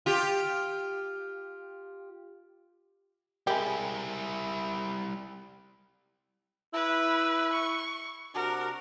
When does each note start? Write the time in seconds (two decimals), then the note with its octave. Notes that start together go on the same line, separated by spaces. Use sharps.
0.06 F4 G4
3.47 G3 G#3 E4 G4 A#4 E5 G#5
6.73 E4 B4
7.53 C#6
8.35 C3 D4 F#4 A#4